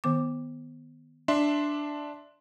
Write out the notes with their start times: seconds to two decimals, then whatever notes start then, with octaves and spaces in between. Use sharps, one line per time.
0.04 D#3 B3 D6
1.28 D4 E5 C6